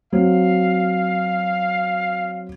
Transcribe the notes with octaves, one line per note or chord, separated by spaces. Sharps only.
F#3 C4 F#4 F5